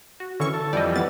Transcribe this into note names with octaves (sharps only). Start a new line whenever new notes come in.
F#4
D3 E3 C#4 C#6
A4
F2 E3 G3 D5 D#5
B3 A6